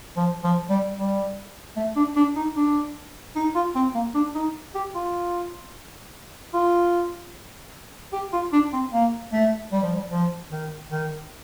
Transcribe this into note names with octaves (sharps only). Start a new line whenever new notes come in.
F3
F3
G3
G3
A3
D4
D4
D#4
D4
D#4
F4
C4
A#3
D4
D#4
G4
F4
F4
G4
F4
D4
C4
A#3
A3
G3
F3
G3
F3
D#3
D#3